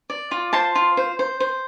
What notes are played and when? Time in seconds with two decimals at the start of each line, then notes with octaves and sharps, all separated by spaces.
0.10 D5
0.31 F4
0.53 C5 A5 C6
0.75 F4
0.97 C5
1.19 C5
1.40 C5